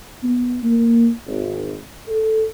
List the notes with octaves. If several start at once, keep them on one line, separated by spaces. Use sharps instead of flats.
B3
A#3
G#1
A4